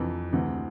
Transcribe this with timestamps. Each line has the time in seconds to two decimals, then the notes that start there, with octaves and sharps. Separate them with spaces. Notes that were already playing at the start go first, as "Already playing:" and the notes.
Already playing: F2 C3 E3
0.33 D2 C3 E3